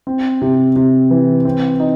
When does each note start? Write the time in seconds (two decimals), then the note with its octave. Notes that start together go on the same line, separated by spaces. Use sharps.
0.07 C4
0.41 C3
0.76 C3
1.11 E3
1.45 C4
1.80 D#4